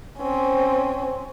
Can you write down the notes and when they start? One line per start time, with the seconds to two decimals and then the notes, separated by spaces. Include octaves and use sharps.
0.19 C4 C#4